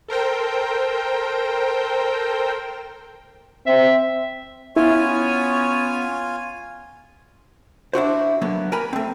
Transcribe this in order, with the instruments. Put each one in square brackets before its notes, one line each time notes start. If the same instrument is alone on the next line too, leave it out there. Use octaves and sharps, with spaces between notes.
[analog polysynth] A4 A#4 C5 G5
[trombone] C4 [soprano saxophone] E5
[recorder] B3 [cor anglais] C#4 [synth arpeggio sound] E4 [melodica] F4 G#5
[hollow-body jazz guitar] D4 E4 F#4 C5
D3 F#3 A#3 B3
A#4 G5 G#5 A#5 B5
A3 C4